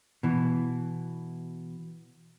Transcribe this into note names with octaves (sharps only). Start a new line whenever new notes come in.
B2 E3